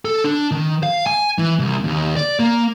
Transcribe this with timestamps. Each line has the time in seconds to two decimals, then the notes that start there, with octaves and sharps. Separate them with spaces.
0.05 A4
0.24 D4
0.51 D#3
0.83 F5
1.07 G#5
1.38 E3
1.59 C2
1.84 D#2
2.16 D5
2.40 A#3